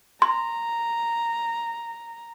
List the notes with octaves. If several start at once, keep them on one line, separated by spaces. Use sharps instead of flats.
A#5 C6